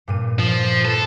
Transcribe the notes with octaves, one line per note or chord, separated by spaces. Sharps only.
G2 A#2 D#7
F3
A4 B4